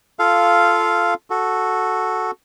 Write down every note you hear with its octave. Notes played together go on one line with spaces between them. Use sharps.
F4 A4 F5
F#4 A4